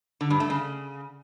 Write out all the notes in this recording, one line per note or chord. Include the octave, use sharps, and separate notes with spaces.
D3
G2
A3
C#3